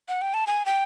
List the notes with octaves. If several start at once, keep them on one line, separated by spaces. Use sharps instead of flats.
F#5
G5
A5
G#5
G5